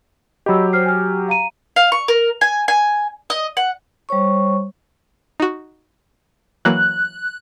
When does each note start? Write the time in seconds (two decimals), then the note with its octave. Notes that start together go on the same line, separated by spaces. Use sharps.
0.46 F#3 G4 D#5 B5 E6
0.73 C5 F6 C7
0.86 G#5 F6
1.28 F5 A#5 D#7
1.76 F5
1.92 C#6
2.08 A#4
2.41 G#5
2.68 G#5
3.30 D#5
3.57 F#5
4.09 G3 C5 C#5 C#6
5.40 D#4 F#4
6.65 E3 F#3 A#3 F#6